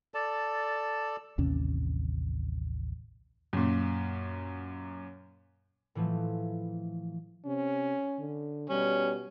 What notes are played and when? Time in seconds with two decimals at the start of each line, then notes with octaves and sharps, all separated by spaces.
0.14 A4 D5 A5
1.38 A1 D#2 C3 C#4
3.53 F#2 A#2
5.95 A2 E3 F3 A3
7.45 C3 C#4
8.19 D3
8.70 B2 G3 C#4